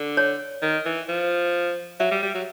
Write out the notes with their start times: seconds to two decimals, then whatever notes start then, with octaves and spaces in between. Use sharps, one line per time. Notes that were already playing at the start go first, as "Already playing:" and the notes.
Already playing: D3
0.17 C#5
0.62 D#3
0.86 E3
1.09 F3
2.00 F#3 E5
2.11 G3
2.23 G3
2.35 F#3